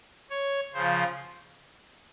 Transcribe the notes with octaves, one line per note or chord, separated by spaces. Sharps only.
C#5
C#3 F3 C5